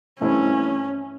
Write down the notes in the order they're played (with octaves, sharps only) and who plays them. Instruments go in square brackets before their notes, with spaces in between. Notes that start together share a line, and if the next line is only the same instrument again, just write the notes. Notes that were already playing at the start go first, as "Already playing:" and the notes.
[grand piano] G2 E3 A3 C4 E4 [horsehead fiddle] C#4